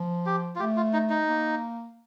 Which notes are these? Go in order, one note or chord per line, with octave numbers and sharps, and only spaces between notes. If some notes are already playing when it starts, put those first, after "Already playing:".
Already playing: F3
G4
F4
A3 G4
F4
D#4
D#4
A#3